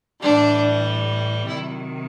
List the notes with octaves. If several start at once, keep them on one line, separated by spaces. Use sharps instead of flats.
A2 E3 G3 D4
C3 D#3 F#3 E4